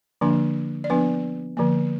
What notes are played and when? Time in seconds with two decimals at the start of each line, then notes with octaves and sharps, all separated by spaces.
0.21 D3 F3 A#3 D4
0.84 D5
0.90 F3 B3 D4 B4
1.57 D3 F3 A#3